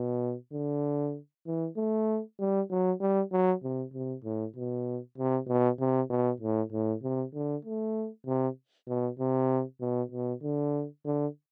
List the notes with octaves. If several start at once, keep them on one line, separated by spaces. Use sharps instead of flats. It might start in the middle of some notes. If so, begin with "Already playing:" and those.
Already playing: B2
D3
E3
A3
G3
F#3
G3
F#3
C3
C3
A2
B2
C3
B2
C3
B2
A2
A2
C3
D3
A3
C3
B2
C3
B2
B2
D3
D3